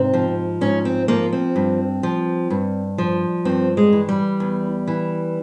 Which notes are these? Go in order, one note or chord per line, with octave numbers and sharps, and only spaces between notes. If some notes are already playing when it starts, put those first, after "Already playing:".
Already playing: G#2 C3 C4
F3
G#2 C#4
C4
F3 A#3
C4
G2
F3
G2
F3
G2 C4
G#3
E3
G3
E2
E3